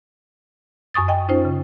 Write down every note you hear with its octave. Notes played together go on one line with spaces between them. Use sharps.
F#2 G#5 C#6 D#6 A6
D#5 G5 G#5
C#4 D#4 F4 C5
C#3